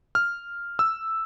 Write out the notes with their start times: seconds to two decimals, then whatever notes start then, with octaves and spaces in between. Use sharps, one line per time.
0.15 F6
0.79 E6